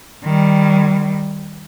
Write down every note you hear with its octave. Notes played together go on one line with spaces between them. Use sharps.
D#3 G3